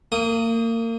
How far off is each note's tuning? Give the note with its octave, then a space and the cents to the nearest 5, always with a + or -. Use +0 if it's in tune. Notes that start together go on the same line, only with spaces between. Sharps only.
A#3 -30 D#6 +0